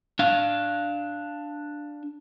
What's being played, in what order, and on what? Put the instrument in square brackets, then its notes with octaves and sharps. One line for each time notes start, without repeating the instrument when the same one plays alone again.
[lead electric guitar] D4 F5